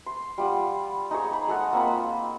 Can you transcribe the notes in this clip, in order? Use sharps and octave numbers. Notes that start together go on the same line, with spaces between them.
C6
G3 F4 F#5
D#4 G#4 C#5
A#5 B5
G#3 A4 F#5 D#6
A#3 C4 F4 B5